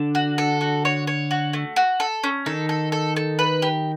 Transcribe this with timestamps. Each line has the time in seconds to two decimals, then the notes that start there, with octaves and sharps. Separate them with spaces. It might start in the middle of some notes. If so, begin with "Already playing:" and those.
Already playing: D3 D4
0.15 F#4
0.38 A4
0.61 F#4
0.85 C#5
1.07 C#5
1.31 F#4
1.53 A3
1.76 F#4
2.00 A4
2.24 C#4
2.46 D#3 D#4 A4
2.69 A4
2.92 A4
3.16 A4
3.39 B4
3.62 G4